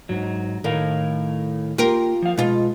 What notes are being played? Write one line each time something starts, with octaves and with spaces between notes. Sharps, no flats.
G#2 F#3
A2 D#3 A#4 F5
A#3 F4 G4 A#4
F3 F5
B2 G#3 F4